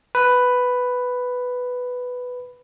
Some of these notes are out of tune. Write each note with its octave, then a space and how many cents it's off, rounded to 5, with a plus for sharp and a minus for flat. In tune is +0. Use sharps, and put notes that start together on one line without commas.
B4 +5